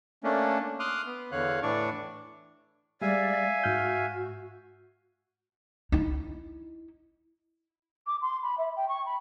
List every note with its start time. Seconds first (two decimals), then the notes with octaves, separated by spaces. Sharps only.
0.24 A3 A#3 C#4 D4
0.80 C6 D6 D#6 F6 F#6
1.06 B3
1.32 E2 D3 C#5 F5 F#6
1.62 A2 E3 D4 D5 C#6
3.02 G3 G#3 D5 E5 F5 G#5
3.63 G#2 F#4 F6 G6
5.92 D#4 E4
8.07 D6
8.22 C6
8.43 B5
8.58 E5
8.76 G5
8.89 C#6
9.06 B5